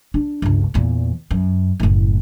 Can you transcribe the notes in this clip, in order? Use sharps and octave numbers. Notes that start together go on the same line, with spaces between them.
D4
G1 C#2
E2 A#2
F#2
F#1 A2